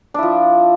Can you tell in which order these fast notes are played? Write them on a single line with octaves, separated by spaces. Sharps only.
D4 E4 F3